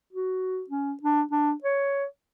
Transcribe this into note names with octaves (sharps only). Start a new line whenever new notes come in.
F#4
C#4
D4
D4
C#5